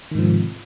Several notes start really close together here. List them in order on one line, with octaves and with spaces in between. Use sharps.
D#3 G#2 F3 C3